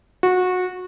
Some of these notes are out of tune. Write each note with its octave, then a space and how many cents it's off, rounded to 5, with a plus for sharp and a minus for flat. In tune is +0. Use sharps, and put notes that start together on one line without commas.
F#4 -20